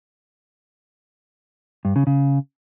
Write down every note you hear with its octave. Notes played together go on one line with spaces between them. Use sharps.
G2
C#3
C#3